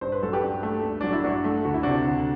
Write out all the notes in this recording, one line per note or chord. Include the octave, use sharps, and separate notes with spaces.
G2 C5
B4
F#3 A4
G4 B4
G2
A3
G2
F#3 D4
E4
G2 D4 F#4
A3
D2 F#4
E4
C3 D4 F#4
D2